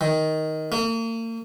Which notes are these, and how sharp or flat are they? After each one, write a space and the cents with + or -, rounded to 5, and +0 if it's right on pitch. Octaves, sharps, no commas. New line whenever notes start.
D#3 +10
A#3 -40